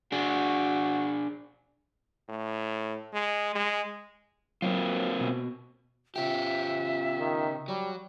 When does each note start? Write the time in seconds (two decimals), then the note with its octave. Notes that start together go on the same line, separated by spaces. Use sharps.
0.12 D4 F#4 G#4
2.29 A2
3.13 G#3
3.55 G#3
4.62 F#3 A#3 C4 F4
5.21 B2
6.16 C#3 F4 G4 E5
7.19 D#3
7.68 F#3 G3